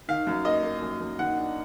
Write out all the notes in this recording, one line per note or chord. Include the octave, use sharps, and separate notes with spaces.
D#3 F5
F#2
A#3 D#5
A#3
F#2
F#2
D#3 F#5
D4